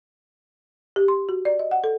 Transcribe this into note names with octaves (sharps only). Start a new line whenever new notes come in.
G4
C6
F#4
D5
D#5
F#5
A4